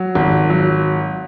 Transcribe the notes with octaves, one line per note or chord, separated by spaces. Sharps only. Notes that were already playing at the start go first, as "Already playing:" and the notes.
Already playing: F#3
G#1
F#3